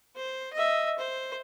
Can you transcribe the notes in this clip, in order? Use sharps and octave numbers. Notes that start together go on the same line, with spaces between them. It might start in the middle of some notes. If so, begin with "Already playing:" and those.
C5
D#5 E5
C5